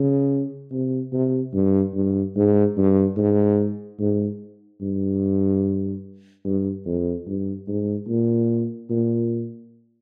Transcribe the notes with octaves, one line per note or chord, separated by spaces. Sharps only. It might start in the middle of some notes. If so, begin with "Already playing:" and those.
Already playing: C#3
C3
C3
G2
G2
G#2
G2
G#2
G#2
G2
G2
F2
G2
G#2
A#2
A#2